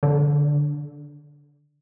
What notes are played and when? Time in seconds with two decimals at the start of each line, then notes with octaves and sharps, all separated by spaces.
0.03 D3